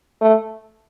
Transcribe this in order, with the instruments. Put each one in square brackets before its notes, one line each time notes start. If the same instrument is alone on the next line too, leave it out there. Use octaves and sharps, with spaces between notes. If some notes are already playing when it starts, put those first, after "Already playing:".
[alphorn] A3